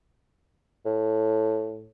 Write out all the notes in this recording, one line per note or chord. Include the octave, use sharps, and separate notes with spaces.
A2